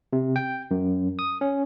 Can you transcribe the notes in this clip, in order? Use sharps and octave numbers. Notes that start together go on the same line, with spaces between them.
C3
G5
F#2
D#6
C#4